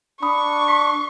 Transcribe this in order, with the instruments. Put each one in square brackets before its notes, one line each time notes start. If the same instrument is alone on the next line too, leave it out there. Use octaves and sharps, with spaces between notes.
[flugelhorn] D4 [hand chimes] B5 D#6 [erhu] C#6
[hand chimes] B6